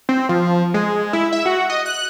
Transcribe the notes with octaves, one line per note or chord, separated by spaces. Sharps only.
C4
F3
G#3
E4
E5
F#4
D#5
F#6